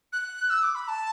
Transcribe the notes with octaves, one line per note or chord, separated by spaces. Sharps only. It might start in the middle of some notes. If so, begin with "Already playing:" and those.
F#6
E6
D6
B5
A5